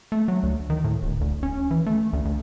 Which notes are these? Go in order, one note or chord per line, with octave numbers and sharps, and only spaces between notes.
A3
F#3
D2
D#3
A2
D1
D2
C#4
E3
A3
D2
D2